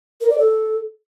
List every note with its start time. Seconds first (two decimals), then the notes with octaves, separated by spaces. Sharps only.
0.21 A#4
0.30 D5
0.38 A4